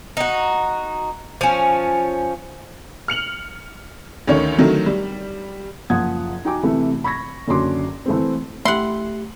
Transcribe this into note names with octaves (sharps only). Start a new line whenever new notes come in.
D#4 F#4
F3 C#4
F6 C#7 F7 F#7
D2 D3 D#3 C#4 C#5
D3 D#3 F#3 A3
G3
F#1 F3 F#5 D#6 G#6
D#4 F#4 G5 G#5 D6
C3 E3 A3
B5 C#6 G#6 A#6
F#1 D3 C#4 F#4 C6 D6
E3 A3 C4
A3 E4 G4 F#5 C6